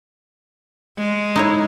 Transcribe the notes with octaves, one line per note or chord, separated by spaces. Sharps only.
G#3
D#4 E4 C#5